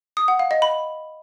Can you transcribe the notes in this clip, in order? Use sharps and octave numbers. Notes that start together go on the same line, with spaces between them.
D#6
F#5
F5
D#5
B5